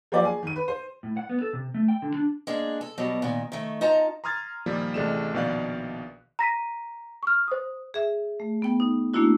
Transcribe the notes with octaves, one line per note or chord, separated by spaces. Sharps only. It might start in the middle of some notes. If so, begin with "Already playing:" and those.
F3 F#3 A#3 G4 D5
G#4 G#5
D#3 D#7
B4
C5
A2
F#5
B3
A4
C3
A3
G5
D3
D4
G#3 A#3 D4 G#4
A4
B2 F#3 G3
A#2 D#3
D#3 A3
D#4 F4 A5 A#5
A#5 C6 D#6 F6 G#6 A6
A#2 D#3 F3 G3 A#3
A1 C3 G#3 A3 D5 E7
A#1 B2 D#3 D5 F5 F#6
A#5 A#6 B6 D#7
C#6 F6
C5 D#6
G#4 E5
A3
B3 G5
D#4
A3 A#3 D4 E4 F#4